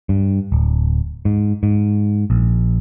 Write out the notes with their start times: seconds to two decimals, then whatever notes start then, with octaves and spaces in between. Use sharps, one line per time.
0.09 G2
0.52 D1
1.25 G#2
1.63 G#2
2.30 A#1